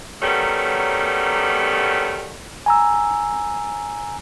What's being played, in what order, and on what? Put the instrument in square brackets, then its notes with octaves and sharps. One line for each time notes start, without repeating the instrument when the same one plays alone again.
[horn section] D#3 F#3 G3 A3 B3 C#4
[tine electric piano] G#5 A#5 E6